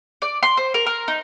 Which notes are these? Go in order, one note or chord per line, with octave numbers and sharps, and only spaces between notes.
D5
C6
C5
A#4
A#4
D#4